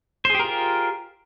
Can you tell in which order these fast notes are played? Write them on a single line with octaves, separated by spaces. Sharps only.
C5 G#4 G4 A#4 F4